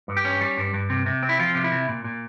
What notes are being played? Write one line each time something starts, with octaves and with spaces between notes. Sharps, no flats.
G2
G4
C#4
G3
G2
G2
C3
C3
C4
E4
F3 F4
C3
E4
C3
A#2
A#2